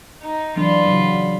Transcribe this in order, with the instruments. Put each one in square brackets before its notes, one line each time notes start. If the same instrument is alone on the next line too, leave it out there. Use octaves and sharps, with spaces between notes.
[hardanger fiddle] D#4
[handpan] E3 F#3 D4 [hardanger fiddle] F4 B5
[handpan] C#3 F#3